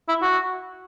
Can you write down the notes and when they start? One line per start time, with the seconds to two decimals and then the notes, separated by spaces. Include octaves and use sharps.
0.08 E4
0.22 F#4